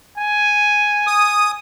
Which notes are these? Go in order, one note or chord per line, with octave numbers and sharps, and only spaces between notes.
G#5
D#6